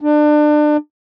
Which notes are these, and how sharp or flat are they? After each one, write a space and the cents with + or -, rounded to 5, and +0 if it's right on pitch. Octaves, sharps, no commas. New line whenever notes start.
D4 +30